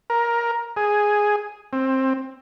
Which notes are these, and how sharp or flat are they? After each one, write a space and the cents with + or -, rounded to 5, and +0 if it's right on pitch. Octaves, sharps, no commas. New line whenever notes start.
A#4 +15
G#4 +0
C4 +20